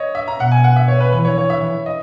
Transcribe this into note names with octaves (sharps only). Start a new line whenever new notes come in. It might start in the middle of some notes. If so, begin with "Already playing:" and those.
Already playing: C#5 D#5
E5
A#5
B2 F#5
G#5
F#5
E5
C#5
B4
E3 B4
C#5
C#5
E5
D#5